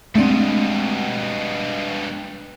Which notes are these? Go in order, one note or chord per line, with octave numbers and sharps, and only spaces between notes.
G2 B2 G#3 A3 C4 D4